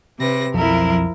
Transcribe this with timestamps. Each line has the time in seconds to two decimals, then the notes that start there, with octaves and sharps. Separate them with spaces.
0.19 C3 B4 A#6
0.54 B1 F2 F3 E4 A#4